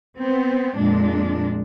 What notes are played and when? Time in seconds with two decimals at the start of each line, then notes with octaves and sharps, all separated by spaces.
0.17 B3 C4
0.77 F2 A#2 G#3 D4